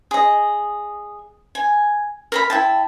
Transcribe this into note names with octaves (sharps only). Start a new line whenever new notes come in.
G#4 D#5
G#5
A#4 A#5 B5
E4 G5 A5